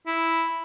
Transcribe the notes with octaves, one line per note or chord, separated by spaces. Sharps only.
E4